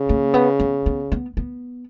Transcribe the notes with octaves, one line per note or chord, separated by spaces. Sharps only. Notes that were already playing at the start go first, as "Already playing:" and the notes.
Already playing: C#3
A#3
B3
B3
B3
B3
B3